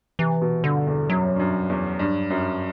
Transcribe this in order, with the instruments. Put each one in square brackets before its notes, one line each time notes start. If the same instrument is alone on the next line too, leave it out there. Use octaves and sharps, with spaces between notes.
[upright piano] C3 [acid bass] E3
[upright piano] B2
[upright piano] G2 [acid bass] D3
[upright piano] E2
[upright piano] F#2 [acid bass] F#3
[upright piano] G2
F#2
E2
G2
F#2